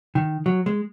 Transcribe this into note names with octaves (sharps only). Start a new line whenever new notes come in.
D#3
F#3
G#3